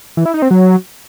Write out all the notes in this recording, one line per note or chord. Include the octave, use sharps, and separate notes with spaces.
E3
E4
D#4
C4
F#3